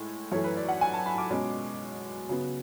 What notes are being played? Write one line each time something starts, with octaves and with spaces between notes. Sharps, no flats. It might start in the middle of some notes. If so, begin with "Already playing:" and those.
Already playing: A2 G#3
F#2 E3 A3 C#5
B4
D5
F#5
G#5
A5
B5
D6
B2 G#3 C#4
C#3 F#3 B3